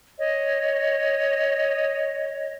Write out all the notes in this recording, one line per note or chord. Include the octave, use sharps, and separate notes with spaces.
C#5 D#5